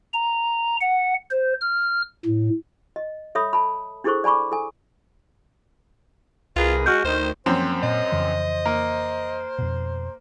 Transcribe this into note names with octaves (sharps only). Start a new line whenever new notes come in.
A#5
F#5
C5
F6
A2
D#5
A4 C#5 E5 B5 D#6
A5 B5
D4 E4 G#4 A4 C5 C#6
D5 G#5 B5 C#6 D6
A4 G#5
C2 F4 G#4 A#4 B4
G#3 F#4 F6 G6
D2 D#3 C5
F#2 E3 F3 A#3 C4 C5
A#2 D#5
F2 C#3 E3
A#3
F2 B2